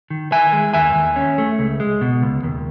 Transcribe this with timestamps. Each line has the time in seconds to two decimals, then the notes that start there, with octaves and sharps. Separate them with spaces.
0.10 D#3
0.32 D#3 E5 G#5
0.53 G#3
0.74 D#2 E5 G#5
0.95 D#2
1.16 C#4
1.38 A3
1.59 C#2
1.80 G#3
2.01 B2
2.22 C#2
2.43 D#2